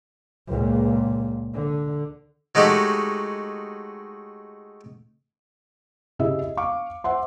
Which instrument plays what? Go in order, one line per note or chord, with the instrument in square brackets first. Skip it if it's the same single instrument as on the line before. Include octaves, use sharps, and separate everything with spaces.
[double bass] C#2 A#2
D3
[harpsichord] F#3 G#3 A3 D#4 F#4 G4
[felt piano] C#3 E4 G4 G#4 D#5 E5
D#5
F5 C#6 D6
C5 E5 F#5 C6